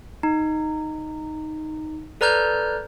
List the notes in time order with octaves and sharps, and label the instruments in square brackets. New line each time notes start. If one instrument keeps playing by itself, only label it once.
[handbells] D#4
A4 B4 D5 A#5 F6 G6